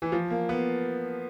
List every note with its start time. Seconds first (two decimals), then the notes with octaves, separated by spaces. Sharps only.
0.02 E3
0.12 F3
0.30 A#3
0.49 B3